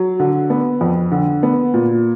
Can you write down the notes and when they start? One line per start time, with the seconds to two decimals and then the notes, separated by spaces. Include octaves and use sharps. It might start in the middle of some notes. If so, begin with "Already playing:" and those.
Already playing: F#3
0.20 D3
0.50 B3
0.81 F2
1.12 D3
1.43 B3
1.74 A#2